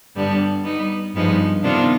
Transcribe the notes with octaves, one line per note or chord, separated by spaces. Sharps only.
G2 D3 G3 B3 D4
G3 B3 D#4
G2 F3 G#3 B3 D#4
C3 D#3 B3 D4 F4